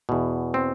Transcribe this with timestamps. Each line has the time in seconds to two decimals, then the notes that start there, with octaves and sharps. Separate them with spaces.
0.09 E2 B2
0.54 C4